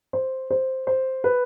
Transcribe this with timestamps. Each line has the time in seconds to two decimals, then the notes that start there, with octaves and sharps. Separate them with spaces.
0.13 C5
0.51 C5
0.87 C5
1.24 B4